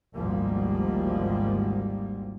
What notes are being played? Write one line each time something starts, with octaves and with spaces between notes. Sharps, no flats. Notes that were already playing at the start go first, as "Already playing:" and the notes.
G#1 D2 G#2 F3 G3 A#3